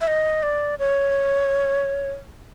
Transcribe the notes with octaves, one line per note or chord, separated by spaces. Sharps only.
E5
D#5
D5
C#5